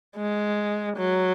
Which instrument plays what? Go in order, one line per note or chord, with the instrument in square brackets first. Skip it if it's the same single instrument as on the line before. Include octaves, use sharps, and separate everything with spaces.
[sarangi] G#3
F#3